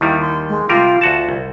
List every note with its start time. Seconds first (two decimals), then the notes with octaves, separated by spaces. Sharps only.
0.01 D#2 D#3 G3 E4
0.21 C6
0.49 G#3
0.69 C3 G3 F4 A#4
1.01 D2 F4 F#4 A5
1.29 C2